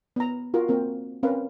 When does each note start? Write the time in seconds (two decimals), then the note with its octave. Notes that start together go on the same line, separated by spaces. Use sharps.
0.16 B3 A#5
0.54 F4 F#4 A#4
0.68 A#3 C4 A#4
1.23 C4 C#4 A#4 B4 F5